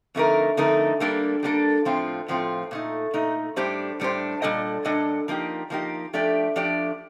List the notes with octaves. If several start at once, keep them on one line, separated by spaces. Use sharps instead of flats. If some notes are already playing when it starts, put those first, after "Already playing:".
F2 D3 A3 D#4 A#4
F2 D3 A3 D#4 A#4
G3 A#3 D4 A4
G3 A#3 D4 A4
A2 F3 C4 F4
A2 F3 C4 F4
A#2 A3 D#4
A#2 A3 D#4
A2 G3 D4 G4 C5
A2 G3 D4 G4 C5
A#2 G3 D4 A4 D#5
A#2 G3 D4 A4 D#5
F3 A#3 D#4 G4
F3 A#3 D#4 G4
F3 A3 D4 G4 D5
F3 A3 D4 G4 D5